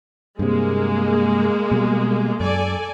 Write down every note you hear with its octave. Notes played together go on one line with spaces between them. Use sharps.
G2 C3 G#3 A#3
B2 G3
F#2 A4 D5 G#5